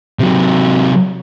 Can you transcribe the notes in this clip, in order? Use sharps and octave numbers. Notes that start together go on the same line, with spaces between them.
C3 F#3